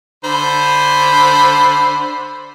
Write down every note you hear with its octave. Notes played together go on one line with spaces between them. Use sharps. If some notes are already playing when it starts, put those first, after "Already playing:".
D3 C5 B5